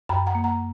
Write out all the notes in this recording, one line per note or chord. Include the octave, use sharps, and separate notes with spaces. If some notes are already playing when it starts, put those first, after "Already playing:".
F#2 G5 B5
F#5 A#5
A#3
F#5 A#5